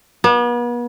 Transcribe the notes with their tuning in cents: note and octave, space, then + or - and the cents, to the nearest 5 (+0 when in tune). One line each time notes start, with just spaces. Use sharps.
B3 -40